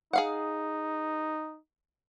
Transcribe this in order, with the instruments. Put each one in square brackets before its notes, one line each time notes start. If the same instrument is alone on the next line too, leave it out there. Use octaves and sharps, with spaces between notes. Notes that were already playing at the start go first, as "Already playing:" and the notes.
[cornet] D#4 [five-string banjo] G#4 F5 F#5